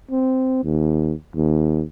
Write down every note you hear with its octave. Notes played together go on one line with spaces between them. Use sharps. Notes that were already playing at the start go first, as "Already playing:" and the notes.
C4
D#2
D#2